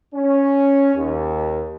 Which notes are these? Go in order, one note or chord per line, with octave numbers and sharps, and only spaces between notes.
C#4
D#2